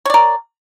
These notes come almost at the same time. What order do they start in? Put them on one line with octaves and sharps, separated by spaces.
C#5 D5 A#4